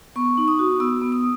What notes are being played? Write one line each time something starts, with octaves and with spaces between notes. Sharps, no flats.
B3 C#6
D#4
D#6
F#4
B3 E6
B3
D#6